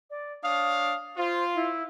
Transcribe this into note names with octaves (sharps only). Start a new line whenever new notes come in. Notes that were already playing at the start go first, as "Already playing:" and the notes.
D5
D4 C#5 F5 D#6
F4 C5
E4